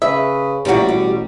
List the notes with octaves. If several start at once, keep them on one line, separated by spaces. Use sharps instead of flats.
C#3 B4 E5
A1 E2 A#2 G3 F#4 A#5
B2